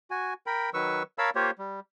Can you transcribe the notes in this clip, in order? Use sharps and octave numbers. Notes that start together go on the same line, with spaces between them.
F#4 G#5
A#4 G5 B5
D#3 F#3 B4 C#6 E6
A#4 C#5 F5 A5 B5 E6
A#3 F4 G4 C5 C#5
G3